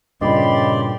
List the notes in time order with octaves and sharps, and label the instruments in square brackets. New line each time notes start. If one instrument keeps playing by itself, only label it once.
[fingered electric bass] G2 A#2 [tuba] C#3 [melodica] G4 D5 C6 [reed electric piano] D#5 B5